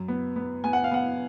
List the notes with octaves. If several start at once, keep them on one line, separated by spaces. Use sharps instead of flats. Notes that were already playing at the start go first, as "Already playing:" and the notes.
Already playing: F#2
B3
B3
B3 G#5
F#5
F5
B3 F#5